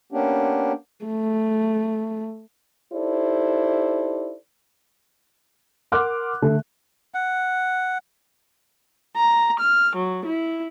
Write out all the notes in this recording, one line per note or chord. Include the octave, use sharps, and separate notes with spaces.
A#3 B3 C#4 D4 G4
A3
D#4 E4 G4 A4 C5 D5
A#4 F#5 C6 D6 F6 F#6
D3 A3
F#5
A#5
F6
F#3
E4